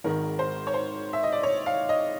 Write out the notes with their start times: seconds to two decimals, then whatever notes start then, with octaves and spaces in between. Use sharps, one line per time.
0.04 G#1 G#2 D#3 A#4
0.39 C5
0.67 C#5
0.74 C5
1.13 E5
1.23 D#5
1.32 D5
1.43 C#5
1.66 F5
1.89 D#5